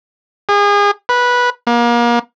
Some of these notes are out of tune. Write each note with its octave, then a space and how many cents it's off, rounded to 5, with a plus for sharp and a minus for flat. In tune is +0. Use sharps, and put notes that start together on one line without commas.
G#4 -35
B4 -10
A#3 +35